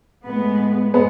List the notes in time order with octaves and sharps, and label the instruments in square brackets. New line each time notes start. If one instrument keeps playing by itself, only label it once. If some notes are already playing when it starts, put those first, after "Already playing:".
[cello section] A2 G#3 B3
[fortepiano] G#3 B3